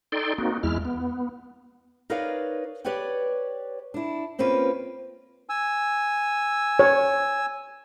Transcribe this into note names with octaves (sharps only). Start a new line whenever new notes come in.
D#4 A4 D5 G5 C6
A#3 C4 D#4 F#4
E2 G#3 E4 F6
B3
D#4 A#4 B4 C#5 D5 F5
G4 B4 C#5 D5 G5
D4 E4
A#3 C4 C#4 F4 B4
G#5 E6
C#5